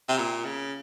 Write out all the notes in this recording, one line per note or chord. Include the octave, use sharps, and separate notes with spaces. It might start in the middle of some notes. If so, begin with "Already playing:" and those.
C3
A#2
C#3